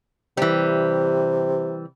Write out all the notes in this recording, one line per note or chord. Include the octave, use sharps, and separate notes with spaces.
C3 E3 G3